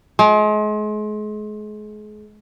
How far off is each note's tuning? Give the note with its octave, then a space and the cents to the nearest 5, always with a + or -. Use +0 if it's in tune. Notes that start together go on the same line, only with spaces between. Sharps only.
G#3 +35